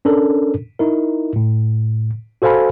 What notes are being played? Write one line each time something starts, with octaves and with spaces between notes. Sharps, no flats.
C#4 D4 A4 A#4
D#4 E4 A#4
A2
F#4 A4 C5 F5 G#5 B5